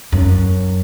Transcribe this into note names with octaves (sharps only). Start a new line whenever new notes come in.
F#2